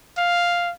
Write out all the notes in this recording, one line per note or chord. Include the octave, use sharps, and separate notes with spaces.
F5